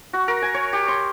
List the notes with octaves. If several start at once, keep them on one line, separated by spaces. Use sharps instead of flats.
F#4
A#4
G#5
C#5
G4
C6